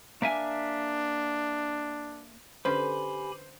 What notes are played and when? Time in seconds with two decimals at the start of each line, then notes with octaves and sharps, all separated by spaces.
0.22 A#3 D4 E5 G#5
2.65 D3 C#4 G4 B4 C5 G#5 B5